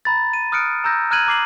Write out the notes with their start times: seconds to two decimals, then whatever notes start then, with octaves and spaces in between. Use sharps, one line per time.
0.05 A#5 B5 A6
0.33 D#7
0.52 D#6 F6 F#6 C#7 D7
0.84 A#5 E6 G6 A#6
1.11 A#5 F6 F#6 G#6 D#7 F#7
1.27 A#5 D6 C7 F#7